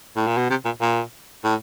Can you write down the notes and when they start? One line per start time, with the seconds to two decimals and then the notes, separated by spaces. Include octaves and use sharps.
0.16 A2
0.27 A#2
0.38 B2
0.50 C3
0.65 A#2
0.81 A#2
1.44 A2